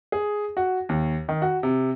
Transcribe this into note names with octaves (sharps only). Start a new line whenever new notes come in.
G#4
F#4
D#2
D#3
F#4
C3